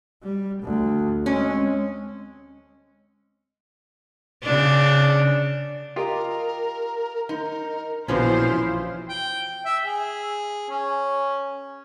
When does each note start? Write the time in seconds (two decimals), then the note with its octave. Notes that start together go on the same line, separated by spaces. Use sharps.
0.23 G3
0.63 D2
1.26 G#3 C4 C#4
4.43 C#3 D4
5.96 F4 G4 A#4 D#5
7.29 D#4 A#4
8.08 A#1 B2 E3 F3 C#4 E4 F4 C5
9.09 G5
9.65 E5
9.85 G#4
10.70 C#4